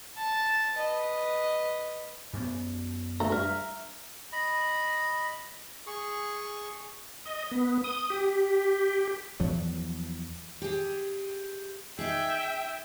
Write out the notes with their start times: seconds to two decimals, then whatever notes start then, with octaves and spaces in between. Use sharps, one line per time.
0.17 A5
0.75 B4 D#5
2.33 F#2 B3
3.20 D2 A4 E5 A#5
3.32 G2 E5 A#5 F6
4.32 D#5 B5
5.87 G#4 C#6
7.26 D#5
7.51 B3
7.84 D#6
8.10 G4
9.40 E2 F3 F#3
10.62 G4 G#4
11.99 D#4 G#4 E5 G5